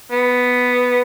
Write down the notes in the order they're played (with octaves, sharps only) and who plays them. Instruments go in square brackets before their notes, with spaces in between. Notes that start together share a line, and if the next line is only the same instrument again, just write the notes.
[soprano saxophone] B3